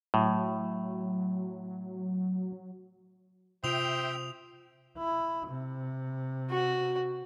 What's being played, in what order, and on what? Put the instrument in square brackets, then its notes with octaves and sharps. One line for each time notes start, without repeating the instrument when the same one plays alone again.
[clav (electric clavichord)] A2 [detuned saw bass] F#3
[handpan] C3 F4 [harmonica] C5 [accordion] E5 G5 [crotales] D#6 F7
[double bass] E4
C3
[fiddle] F#4